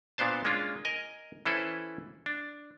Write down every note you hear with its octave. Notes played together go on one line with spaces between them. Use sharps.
A#2 B3 D4 C5 A5
G#3 A#3 C#4 D4 F4
A#4 D#5 G#5
E3 C#4 E4 A4 B4 C5
D4